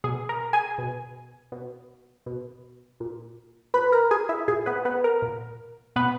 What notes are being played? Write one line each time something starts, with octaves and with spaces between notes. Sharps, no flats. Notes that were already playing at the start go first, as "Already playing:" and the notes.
B2 G#4
A#4
G#4 G#5
B2
B2
B2
A#2
A#2 B4 B5
A#4 A#5
G#4 G#5
E4 E5
A#2 G#4
B3 B4
B3 B4
A#4
A#2
B2 B3 B4